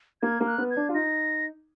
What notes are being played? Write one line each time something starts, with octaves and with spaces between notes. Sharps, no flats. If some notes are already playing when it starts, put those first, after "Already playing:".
A#3 G#6
A#3
F#6
B3
G#6
D4
F4
D#4 A#6